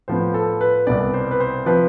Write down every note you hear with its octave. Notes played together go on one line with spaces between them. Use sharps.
A2 F3 B3 C5
A4
B4
C2 B2 B3 D5
C5
B4
C5
C3 F3 B4